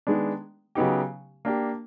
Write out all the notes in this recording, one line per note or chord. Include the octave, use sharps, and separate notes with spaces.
D#3 G#3 B3 D4
C#3 F#3 B3 D#4 G4
A#3 D4 G4